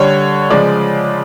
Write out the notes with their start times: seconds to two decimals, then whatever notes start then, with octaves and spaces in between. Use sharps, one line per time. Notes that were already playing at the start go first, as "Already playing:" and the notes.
Already playing: D3 G3 C#5
0.50 C#3 F3 G#3 D5